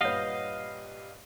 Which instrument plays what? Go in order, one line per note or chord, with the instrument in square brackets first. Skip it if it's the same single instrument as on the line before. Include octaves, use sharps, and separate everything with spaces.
[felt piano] G2 A#2 B4 [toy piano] C#5 F#5 [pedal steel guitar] D#5 F5